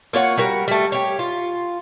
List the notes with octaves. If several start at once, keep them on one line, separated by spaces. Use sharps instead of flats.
A#3 F4 C#5 F#5
G3 F#4 A#4
G3 A3
G4 C#5
F4